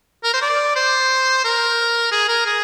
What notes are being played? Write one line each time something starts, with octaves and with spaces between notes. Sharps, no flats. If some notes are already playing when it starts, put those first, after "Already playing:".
A#4
C5
D5
C5
A#4
G#4
A#4
G#4